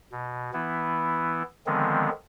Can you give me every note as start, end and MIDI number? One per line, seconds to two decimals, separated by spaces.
0.12 0.51 47
0.53 1.43 52
0.53 1.43 59
0.53 1.43 64
1.66 2.10 50
1.66 2.10 51
1.66 2.10 53
1.66 2.10 56
1.66 2.10 59
1.66 2.10 60